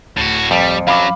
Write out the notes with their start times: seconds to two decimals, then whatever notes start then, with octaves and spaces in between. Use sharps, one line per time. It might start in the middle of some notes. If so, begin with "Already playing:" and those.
0.17 D1 A2 F#4
0.51 F2 G3
0.87 F#2 F#3 F5 B5 D6